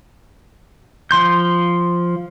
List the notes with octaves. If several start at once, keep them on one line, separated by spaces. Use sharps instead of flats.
F3 C6 G6